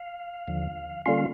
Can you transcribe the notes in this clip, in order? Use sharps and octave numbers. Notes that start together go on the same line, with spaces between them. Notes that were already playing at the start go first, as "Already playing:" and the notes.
Already playing: F5
D#2 D3 F3
D3 G3 A#3 C#4 F4 F5